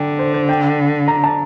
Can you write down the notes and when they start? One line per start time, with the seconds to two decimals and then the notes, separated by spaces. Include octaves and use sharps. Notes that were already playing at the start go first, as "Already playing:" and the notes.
Already playing: D3 G5
0.19 C5
0.34 C5
0.49 G5
1.08 A#5
1.24 A5